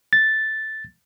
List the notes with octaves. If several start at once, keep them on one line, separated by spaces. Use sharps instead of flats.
A6